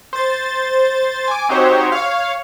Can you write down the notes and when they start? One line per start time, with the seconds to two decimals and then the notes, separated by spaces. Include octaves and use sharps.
0.13 C5 A6
1.28 G#5 D6
1.49 C4 D#4 F#4 G4 C5 C#5
1.92 C#5 F5